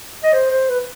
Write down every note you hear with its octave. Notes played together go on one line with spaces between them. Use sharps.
D#5
C5
C5
B4